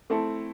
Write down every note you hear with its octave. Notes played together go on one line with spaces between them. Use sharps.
A3 C4 E4 A4